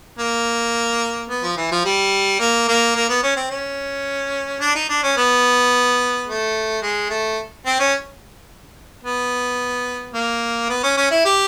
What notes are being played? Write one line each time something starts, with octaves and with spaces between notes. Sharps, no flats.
A#3
B3
F3
E3
F3
G3
A#3
A#3
A#3
B3
C#4
C4
C#4
D4
D#4
D4
C#4
B3
A3
G#3
A3
C4
C#4
B3
A#3
B3
C#4
C#4
E4
G4